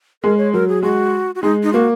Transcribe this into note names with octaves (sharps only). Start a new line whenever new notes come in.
G#3 A#4
C#5
F#3 A#4
G#4
G#3 F#4
F#4
G#3 D#4
D#4
A#3 F#4